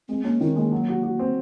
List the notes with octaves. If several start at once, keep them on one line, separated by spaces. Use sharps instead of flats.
G#3 C4
A#3 C#4
D#3 C4
G#3 A#3
F#3
F#4
F#4
C4